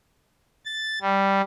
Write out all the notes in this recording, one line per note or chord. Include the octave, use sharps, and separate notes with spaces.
A6
G3